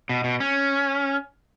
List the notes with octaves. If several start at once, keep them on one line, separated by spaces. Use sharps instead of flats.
B2
B2
C#4